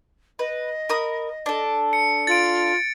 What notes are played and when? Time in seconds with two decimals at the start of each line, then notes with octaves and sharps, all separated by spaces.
0.39 B4 D#5
0.89 A#4 B5 D#6
1.46 D4 A4
1.93 C#7
2.27 F4 A6 D7